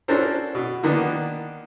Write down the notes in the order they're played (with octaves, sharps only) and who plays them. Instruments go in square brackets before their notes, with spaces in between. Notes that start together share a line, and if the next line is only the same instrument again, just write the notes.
[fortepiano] C#4 D4 F#4 A4 A#4 C5
B2
D3 D#3 A#3 B3 D4